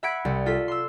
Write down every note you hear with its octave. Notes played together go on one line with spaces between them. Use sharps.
E5 F#5 B5 G#6 B6 D7
C2
F4 A4 B6
C6 E6